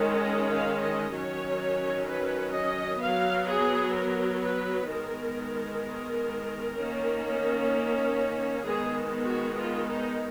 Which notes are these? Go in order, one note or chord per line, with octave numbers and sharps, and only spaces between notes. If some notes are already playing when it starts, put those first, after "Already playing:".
Already playing: D#3 G#3 C#4
D#5
F5
D#5
D#3 F#3 C#4 C#5
B4
D#5
F#3 B3 F5
G#4
A#4
B4
D#3 G#3 B3 A#4
D#3 A#3 C#4
D#3 G#3 B3 G#4
F#4
F4
D#4